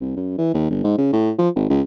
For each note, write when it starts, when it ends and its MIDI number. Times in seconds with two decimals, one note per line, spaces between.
0.01 0.13 36
0.16 0.38 42
0.38 0.51 52
0.54 0.69 39
0.70 0.81 31
0.84 0.94 44
0.98 1.12 49
1.13 1.31 45
1.38 1.49 53
1.56 1.68 32
1.70 1.82 37